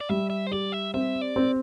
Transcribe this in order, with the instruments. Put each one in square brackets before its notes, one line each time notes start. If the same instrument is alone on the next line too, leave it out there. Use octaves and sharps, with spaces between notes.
[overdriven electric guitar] D5
[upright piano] G3 [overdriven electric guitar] E5
[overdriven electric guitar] E5
C5
[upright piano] G4 [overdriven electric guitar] D5
[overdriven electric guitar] E5
[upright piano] C4 [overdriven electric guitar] E5
[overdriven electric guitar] D5
[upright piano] C4